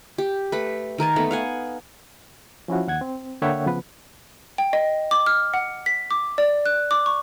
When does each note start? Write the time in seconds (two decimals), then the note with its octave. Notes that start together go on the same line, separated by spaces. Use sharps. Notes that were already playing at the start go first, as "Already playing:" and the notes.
0.18 G4
0.52 A3 B4
0.98 D#3 A#4 G#5 A5
1.16 A3 B3 D#4
1.31 F5 F#5 G#5
2.68 F3 C#4 E4 F#4
2.88 D#2 F#5 G#6
3.01 C4
3.42 D3 A#3 C#5 E5 F#5 G5
3.66 C#3 F3 B3 B4
4.58 G5
4.73 D#5
5.11 D6
5.26 F6
5.54 F#5
5.86 B6
6.11 D6
6.38 D5
6.66 F#6
6.91 D6
7.06 C#6